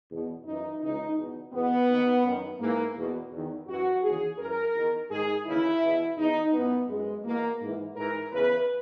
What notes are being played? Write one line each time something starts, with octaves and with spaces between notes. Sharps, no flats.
E2 B2
F#2 E3 D#4
C#2 C#3 E3 D#4
E2 B2
E2 B2 B3
D#2 D#3
F#2 D#3
G#2 E3 A#3
E2 B2
E2 D#3
F#2 E3 F#4
D#2 C#3 E3 G#4
F#2 E3 A#4
E2 D#3
G#2 D#3 G#4
D#2 C#3 E3 E4
E2 B2
E2 B2 D#4
F#2 E3 B3
F#2 E3 G#3
E2 B2 A#3
G#2 E3
G#2 E3 A#4
E2 C#3 E3 B4